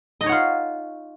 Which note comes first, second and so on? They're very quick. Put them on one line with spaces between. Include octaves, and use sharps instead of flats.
D#5 D#4 C#5 F#5 F4